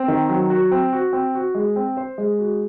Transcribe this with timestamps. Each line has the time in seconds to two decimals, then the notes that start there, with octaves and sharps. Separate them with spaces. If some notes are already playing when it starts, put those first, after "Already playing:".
Already playing: C4
0.08 D#3
0.29 F#3
0.50 F#4
0.71 C4
0.93 F#4
1.13 C4
1.35 F#4
1.55 G#3
1.76 C4
1.97 C5
2.18 G#3
2.39 F#4